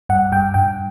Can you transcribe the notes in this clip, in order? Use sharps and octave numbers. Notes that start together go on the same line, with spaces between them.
G2 F#5
G2 G5
G2 G5